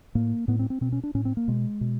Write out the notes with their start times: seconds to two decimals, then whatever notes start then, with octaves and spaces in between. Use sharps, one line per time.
0.15 A2 A#3
0.48 A2 B3
0.59 C4
0.70 C4
0.81 B2 C4
0.92 C#4
1.03 D4
1.15 A2 C#4
1.25 C4
1.37 A#3
1.48 B2 G#3
1.81 B2